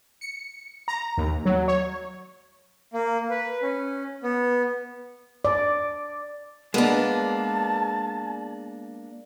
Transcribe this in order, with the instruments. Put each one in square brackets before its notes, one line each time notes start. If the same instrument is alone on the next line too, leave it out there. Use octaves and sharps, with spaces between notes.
[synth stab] C#7
A#5
D#2
F#3
C#5
[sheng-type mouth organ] A#3
B4
C#4
B3
[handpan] D5
[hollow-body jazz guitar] G#3 B3 B4 [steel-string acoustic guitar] A#3 D4 [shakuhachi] A5